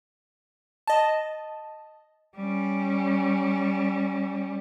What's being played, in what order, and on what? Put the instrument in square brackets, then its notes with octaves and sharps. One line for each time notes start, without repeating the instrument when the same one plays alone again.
[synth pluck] D#5 A5
[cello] G3 C#4